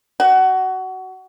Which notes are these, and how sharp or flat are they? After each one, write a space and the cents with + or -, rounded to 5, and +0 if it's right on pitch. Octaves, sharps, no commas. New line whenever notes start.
F#4 +20